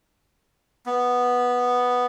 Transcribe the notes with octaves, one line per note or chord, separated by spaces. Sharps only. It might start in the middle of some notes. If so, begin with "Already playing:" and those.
B3